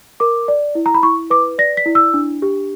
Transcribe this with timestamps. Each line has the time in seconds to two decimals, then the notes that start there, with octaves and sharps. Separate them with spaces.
0.20 A#4 D6
0.48 D5
0.75 E4
0.86 A#5
0.94 B5
1.03 E4 C#6
1.30 B4 D6
1.58 D5 A#6
1.77 B6
1.86 E4
1.95 E6
2.14 D4
2.42 G4